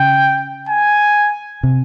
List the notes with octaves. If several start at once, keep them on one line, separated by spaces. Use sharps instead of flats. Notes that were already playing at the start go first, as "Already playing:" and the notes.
Already playing: C#3 G5
G#5
C3